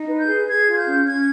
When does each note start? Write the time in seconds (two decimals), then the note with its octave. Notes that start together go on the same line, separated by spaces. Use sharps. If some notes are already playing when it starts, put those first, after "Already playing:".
Already playing: D#4
0.08 B4
0.18 G6
0.27 G#4
0.47 G#4 G#6
0.67 F4 G#6
0.77 G6
0.87 C#4
1.06 C#4 G#6